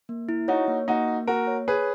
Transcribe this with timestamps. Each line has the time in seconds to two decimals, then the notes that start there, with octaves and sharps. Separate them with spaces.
0.09 A#3
0.29 E4
0.48 D#4 F#4 C#5
0.68 A#3
0.88 A#3 D#4 F#4
1.08 A#3
1.27 A#3 F#4 A#4
1.47 C#5
1.68 G#4 B4 C#5